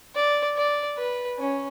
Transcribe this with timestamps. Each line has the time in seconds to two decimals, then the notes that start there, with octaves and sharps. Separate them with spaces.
0.16 D5
0.57 D5
0.98 B4
1.39 C#4